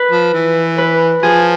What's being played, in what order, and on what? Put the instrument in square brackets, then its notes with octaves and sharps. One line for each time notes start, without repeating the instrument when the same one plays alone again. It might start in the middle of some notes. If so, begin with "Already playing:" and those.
Already playing: [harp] B4
[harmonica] F3
E3
[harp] B4
[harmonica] F3 [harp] G#4